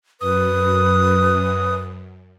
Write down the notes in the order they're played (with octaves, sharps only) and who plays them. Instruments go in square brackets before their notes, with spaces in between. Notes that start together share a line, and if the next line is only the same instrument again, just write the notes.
[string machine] F#2 [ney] B4 [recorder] D#6